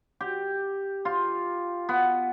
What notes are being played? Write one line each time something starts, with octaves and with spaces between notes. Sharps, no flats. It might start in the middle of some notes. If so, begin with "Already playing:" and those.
G4
F4
B3